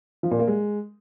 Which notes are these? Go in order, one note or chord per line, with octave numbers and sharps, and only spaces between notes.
F3
A#2
A#3
G#3